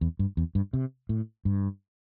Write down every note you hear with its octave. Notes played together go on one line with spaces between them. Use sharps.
E2
G2
E2
G2
C3
A2
G2